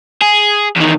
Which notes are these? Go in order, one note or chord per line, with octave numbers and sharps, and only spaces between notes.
G#4
E2 D#3